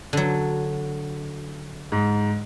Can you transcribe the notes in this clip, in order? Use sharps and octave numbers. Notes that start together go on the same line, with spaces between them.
D3 F#3
G#2